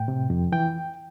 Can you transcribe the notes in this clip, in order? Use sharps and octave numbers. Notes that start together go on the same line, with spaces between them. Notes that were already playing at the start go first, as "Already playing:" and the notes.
Already playing: A2 G5
C3
F2
E3 G5